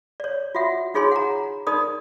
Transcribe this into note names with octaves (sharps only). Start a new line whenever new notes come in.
C#5 D5
F4 F#4 E5 F#5
D#4 F4 G#4 C#5 G#5 C6
F#5 A#5
D#4 A#4 D5 B5 D#6